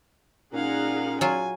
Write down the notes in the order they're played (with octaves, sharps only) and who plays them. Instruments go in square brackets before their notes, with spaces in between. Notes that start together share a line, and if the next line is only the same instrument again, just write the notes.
[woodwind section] A#2 C#4 [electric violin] D#4 F5 [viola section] G#4 F#5 A#5
[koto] F#3 F4 [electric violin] G#5